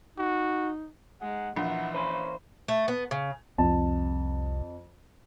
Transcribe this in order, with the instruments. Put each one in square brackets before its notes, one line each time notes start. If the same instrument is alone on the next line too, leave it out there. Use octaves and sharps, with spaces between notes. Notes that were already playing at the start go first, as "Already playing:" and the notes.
[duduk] D#4 [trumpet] F#4
[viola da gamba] G#3 [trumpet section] D#4 G#4 F#5
[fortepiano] A#1 [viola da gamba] E3 [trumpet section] D#4 F4 F#5
[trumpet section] A#3 C#4 [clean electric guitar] C5 B5 C6
[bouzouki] A3
B3
C#3
[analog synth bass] C2 [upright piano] F2 A5